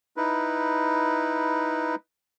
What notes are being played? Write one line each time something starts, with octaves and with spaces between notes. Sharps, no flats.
D#4 E4 B4